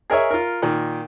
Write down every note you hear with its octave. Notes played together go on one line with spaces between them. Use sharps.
G#4 A#4 C#5 D#5 E5
F4 A#4
A#2 D#3